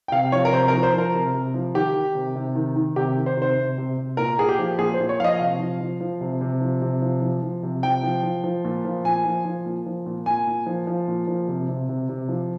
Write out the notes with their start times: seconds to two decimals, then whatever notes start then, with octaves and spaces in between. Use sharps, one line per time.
0.08 G5
0.12 C3 F5
0.32 F3 C#5
0.45 A#4
0.52 C3 C5
0.68 A#4
0.73 F3
0.83 C5
0.93 F3
0.98 A#4
1.14 C3
1.34 C3
1.54 F3
1.74 D#3 G4
1.95 D#3
2.15 C3
2.36 C3
2.55 D#3
2.76 D#3
2.96 C3 G4
3.16 D#3
3.26 C5
3.37 C3
3.42 C5
3.57 C3
3.78 C3
3.98 C3
4.17 A#2 A#4
4.38 A#2 G#4
4.49 G4
4.59 F3
4.79 A#2 G#4
4.94 C5
4.99 A#2
5.09 C#5
5.20 F3 F5
5.24 D#5
5.39 C3 F5
5.59 F3
5.81 F3
6.01 F3
6.21 C3
6.41 C3
6.61 F3
6.82 C3
7.02 F3
7.22 F3
7.43 F3
7.63 C3
7.83 F3 G5
8.03 F3
8.23 F3
8.44 F3
8.65 A#2
8.85 F3
9.04 A#2 G#5
9.25 F3
9.45 F3
9.66 A#2
9.86 F3
10.06 A#2
10.26 A#2 G#5
10.47 A#2
10.66 F3
10.87 F3
11.08 A#2
11.27 F3
11.48 C3
11.69 C3
11.89 C3
12.09 C3
12.29 F3